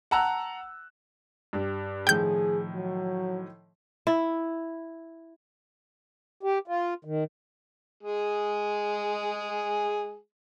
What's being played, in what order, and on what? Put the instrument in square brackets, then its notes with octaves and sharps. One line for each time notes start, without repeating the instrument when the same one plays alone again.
[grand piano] F#5 A5 A#5 E6 F#6
[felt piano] G2 G3
[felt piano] A2 D#3 F3 [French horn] G#4 [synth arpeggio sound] G5 G6
[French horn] F#3
[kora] E4
[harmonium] G4
F4
D#3
[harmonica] G#3 G#4